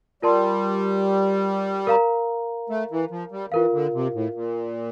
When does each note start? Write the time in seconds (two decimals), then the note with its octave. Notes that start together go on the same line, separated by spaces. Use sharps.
0.22 G3 F4 A#4 D5 A5 C6
1.87 A#4 F5 A#5
2.70 A3
2.91 E3
3.11 F3
3.32 G3
3.52 E3 F4 A#4 F5
3.73 D3
3.93 C3
4.14 A2
4.34 A#2